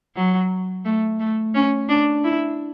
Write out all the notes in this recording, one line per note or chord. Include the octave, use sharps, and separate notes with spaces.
F#3
A3
A3
C#4
D4
E4